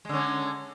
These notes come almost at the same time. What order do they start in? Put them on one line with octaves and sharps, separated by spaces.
G#3 D3 C#4